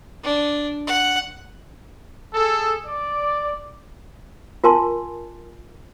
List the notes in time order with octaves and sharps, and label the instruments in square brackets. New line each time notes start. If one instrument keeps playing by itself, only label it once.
[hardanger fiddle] D4
F#5
[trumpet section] G#4 A4
D5
[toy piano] F4 A#4 G#5 A5 C6